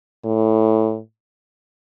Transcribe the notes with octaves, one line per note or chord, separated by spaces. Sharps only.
A2